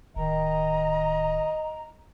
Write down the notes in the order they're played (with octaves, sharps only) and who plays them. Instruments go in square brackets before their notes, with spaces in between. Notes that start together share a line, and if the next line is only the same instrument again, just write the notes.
[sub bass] D1 [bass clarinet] D#3 [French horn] D#5 [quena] A#5